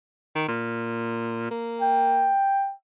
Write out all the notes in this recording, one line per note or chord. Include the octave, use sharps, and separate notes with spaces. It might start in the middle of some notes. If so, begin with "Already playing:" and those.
D#3
A#2
A#3
G5